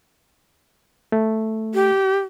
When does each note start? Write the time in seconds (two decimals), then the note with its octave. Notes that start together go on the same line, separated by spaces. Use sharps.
1.12 A3
1.74 G4